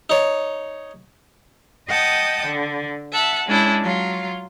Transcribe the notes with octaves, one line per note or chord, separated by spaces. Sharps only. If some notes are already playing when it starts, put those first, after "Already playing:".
D#4 C#5
D#5 F#5 G5 A5 D#6
D3
E5 F#5 A5
G#3 C#4 D4 E4
F#3 F4